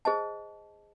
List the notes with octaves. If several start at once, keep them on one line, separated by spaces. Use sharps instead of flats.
G#4 C5 D#5 A5